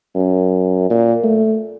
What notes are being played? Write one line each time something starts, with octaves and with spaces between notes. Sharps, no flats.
F#2
A#2
A3